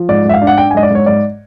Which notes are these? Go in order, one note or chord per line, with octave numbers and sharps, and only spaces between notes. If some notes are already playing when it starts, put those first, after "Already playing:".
Already playing: F3
G#2 D5
G#2 E5
F5
D4
F#5
D4 G5
G#5
G#2 D#5
D5
G#2 C#5
G#2 D5